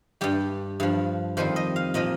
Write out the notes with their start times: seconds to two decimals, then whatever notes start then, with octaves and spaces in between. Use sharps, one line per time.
0.21 G2 G3 G4
0.80 G2 F3
1.37 F2 D#3 G3 C5
1.56 D#5
1.76 F5
1.94 A#2 F3 D#5